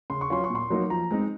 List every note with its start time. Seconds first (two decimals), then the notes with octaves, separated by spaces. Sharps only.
0.10 C#3 C6
0.21 C#6
0.30 F#3 C#4 F4 C6
0.44 C#6
0.50 A#2 C6
0.70 F#3 A#3 D#4
0.90 F3 A#5
1.11 G#3 C4 D#4